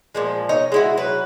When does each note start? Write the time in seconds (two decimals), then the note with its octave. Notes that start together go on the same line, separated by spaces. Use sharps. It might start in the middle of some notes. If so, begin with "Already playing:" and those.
0.15 A#2 F3 G#3
0.49 D#4 C#5 D#5
0.72 G#3 E4 F#4
0.97 F#3 B4